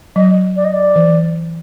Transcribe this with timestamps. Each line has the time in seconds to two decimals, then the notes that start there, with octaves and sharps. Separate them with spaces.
0.16 F#3 D#5
0.56 D5
0.65 D#5
0.73 D5
0.96 E3